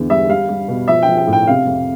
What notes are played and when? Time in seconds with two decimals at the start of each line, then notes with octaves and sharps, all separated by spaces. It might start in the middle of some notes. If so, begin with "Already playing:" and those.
Already playing: E2 D3
0.10 G3 E5
0.29 G3 F5
0.49 G3
0.68 B2
0.88 F3 E5
1.03 G5
1.08 F3
1.18 G5
1.27 A2
1.33 G5
1.47 C3 F5
1.67 F2